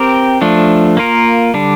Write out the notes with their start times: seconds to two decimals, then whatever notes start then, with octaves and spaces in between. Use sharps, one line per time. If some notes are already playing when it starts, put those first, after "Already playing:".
Already playing: C4 G4 A#4
0.41 F3 A3 D4
0.97 A#3 F4 A#4
1.54 D3 G3 D4